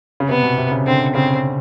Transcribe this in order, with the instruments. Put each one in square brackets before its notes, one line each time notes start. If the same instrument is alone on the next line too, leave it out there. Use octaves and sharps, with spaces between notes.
[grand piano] C#3
[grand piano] C3 [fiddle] B3
[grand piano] B2
C3
C#3
[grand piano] D3 [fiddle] C4
[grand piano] C#3 [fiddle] C4